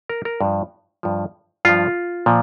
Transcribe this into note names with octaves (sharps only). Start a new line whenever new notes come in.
A#4
A#4
G2 F3
G2 F3
G2 F3 F4
A#2 F3